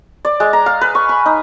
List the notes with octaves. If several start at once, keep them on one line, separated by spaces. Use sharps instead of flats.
D5
G#3
A#5
F5
B4
C#6
B5
D#4